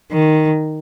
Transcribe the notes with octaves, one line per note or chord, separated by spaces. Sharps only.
D#3